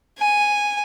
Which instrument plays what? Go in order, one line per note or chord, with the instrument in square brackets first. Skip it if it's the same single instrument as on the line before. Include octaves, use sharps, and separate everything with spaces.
[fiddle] G#5